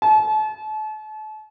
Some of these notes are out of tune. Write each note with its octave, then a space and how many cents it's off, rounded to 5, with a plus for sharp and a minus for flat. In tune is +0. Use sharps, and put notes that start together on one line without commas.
A5 -35